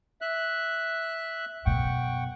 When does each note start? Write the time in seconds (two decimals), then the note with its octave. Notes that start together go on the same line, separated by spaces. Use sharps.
0.21 E5 F#6
1.66 F#2 B2 F#5 G5 C#6